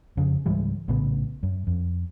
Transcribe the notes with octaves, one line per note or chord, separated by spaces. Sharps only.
F2 C#3
C#2 G#2 E3 G3
A#1 A2 C#3 B3
F#2
F2